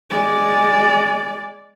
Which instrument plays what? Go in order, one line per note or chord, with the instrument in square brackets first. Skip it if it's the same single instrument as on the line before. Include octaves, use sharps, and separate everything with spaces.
[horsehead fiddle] G#3 D5